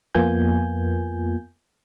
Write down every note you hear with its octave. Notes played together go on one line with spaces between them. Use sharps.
F2 A#3 B3 F4 G#5 G6